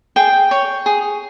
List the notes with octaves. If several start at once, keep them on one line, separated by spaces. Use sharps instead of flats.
G#4 G5
C#5
G#4